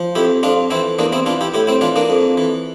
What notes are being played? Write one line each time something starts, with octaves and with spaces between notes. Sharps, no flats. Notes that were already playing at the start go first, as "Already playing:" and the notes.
Already playing: F3
F2 E4 G4
F2 D4 F4
E3 C4 E4
E2 A#3 D4
C4 E4
E3 D4 F4
E4 G4
A2 E4 G4
C4 E4
E3 D4 F4
A#3 D4
F2
E3